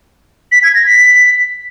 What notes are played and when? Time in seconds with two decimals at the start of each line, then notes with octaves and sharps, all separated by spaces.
0.52 B6
0.63 G#6
0.75 A#6
0.86 B6